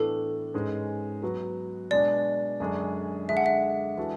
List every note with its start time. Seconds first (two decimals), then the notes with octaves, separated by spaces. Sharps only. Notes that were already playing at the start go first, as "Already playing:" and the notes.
Already playing: A2 E3 B3 D4 A4
0.53 G#2 G#3 C#4 G#4 B4
1.22 F#3 B3 F#4 B4
1.91 B2 G#3 D4 D5
2.60 F#2 D3 G#3 D4 G#4
3.29 D3 G#3 D4 G#4 E5
3.37 F#5
3.46 E5
3.97 E3 G#3 D4 F#4 A4